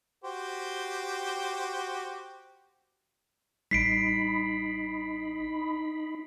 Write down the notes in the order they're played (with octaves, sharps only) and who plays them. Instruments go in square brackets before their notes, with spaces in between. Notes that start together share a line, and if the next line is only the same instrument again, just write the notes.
[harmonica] F#4 G4 C5
[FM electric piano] A1 G3 [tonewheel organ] D#4 B5 [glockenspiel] B6 C7 D7